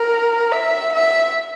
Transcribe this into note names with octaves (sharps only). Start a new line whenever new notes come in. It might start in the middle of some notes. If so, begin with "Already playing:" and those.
Already playing: A#4
E5
E5